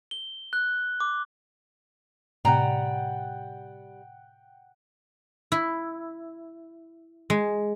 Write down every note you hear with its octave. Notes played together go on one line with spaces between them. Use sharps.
G7
F#6
D6
A2 C3 G3 F#5 G5 A#5
E4
G#3